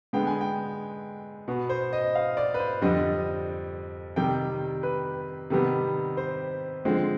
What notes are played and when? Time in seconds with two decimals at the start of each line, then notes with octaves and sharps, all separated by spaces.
0.13 D3 G#3 B3 G5
0.27 G#5
0.41 G5
1.48 B2 B3
1.69 C5
1.93 D#5
2.15 F5
2.37 D5
2.54 B4
2.59 C5
2.82 F2 D3 G3 C4 D#5
4.16 C3 D#3 G3 G5
4.83 B4
5.50 C3 D#3 G3 B3
6.17 C5
6.85 D3 F3 G#3 C4